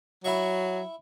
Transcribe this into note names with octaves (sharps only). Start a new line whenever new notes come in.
F#3 E4 E5 C#6